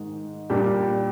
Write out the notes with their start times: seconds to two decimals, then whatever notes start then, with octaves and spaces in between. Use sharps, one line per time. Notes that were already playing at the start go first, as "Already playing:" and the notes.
Already playing: G#2 D#3 G#3
0.50 A#2 G3 D4 G4